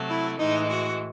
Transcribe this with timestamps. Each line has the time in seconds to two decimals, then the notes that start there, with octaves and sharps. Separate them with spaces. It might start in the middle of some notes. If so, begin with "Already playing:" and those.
Already playing: C3 F#3 A3
0.08 E4
0.38 A2 E3 G#3 D#4
0.69 F#4